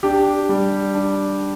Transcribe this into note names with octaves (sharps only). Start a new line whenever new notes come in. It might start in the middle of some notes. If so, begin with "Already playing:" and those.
D4 G4
G3
D4